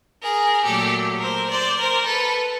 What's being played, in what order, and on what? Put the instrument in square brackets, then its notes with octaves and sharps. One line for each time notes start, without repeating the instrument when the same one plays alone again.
[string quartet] G#4 A#4
A#2 F#3 A3 G4 A4
A#4 C5
C5 D5
A#4 C5
A4 B4